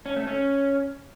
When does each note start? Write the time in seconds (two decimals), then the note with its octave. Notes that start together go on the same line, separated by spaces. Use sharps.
0.06 C#4
0.16 A3
0.27 C#4